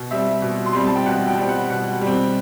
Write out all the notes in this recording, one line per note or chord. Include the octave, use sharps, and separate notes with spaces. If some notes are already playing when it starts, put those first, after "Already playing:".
Already playing: B2
G3 C4 E5
B2
C6
G3 C4 B5
A5
G5
B2 F#5
G5
G3 C4
F#5
B2 F#5
G3
C4